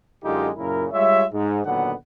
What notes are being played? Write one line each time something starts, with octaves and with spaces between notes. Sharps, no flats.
F#2 D3 G#3 D#4 F4 G4
F#2 A#2 C#3 E4 A#4
G3 G#3 F4 C#5 E5
G#2
A#2 D3 D#3 F#3 B3 F#5